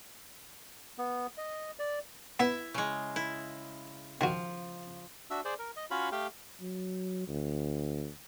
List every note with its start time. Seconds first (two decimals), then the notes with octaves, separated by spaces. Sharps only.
0.99 B3
1.38 D#5
1.79 D5
2.40 B3 E4 E5
2.74 C#3 G#3
3.16 E4
4.21 D#3 F3 F#4
5.30 D4 F#4 E5 E6
5.45 G#4 C5 D5
5.59 A#4
5.76 D#5
5.91 C#4 F4 F#4 C#5 F5 B5
6.12 A3 G4 F5 G5
6.61 F#3
7.28 D2